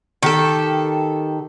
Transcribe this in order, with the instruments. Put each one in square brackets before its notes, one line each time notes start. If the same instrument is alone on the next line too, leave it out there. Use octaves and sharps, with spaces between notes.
[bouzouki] D#3 G4 A4